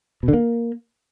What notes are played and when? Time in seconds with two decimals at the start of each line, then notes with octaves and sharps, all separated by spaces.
0.23 B2
0.28 D3
0.33 A#3